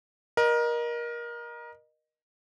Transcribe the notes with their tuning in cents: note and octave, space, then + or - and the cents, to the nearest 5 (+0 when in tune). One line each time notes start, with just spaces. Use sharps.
A#4 +25 D#5 -20